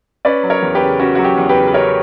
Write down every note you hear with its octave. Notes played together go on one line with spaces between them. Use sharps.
C#4 B4 D5
F#3
A#4 C#5
E2
G4 B4
C#3
C#4 F#4
F#3 F#4
G4
E2
G4 B4
C#3
B4
C#4 A#4 C#5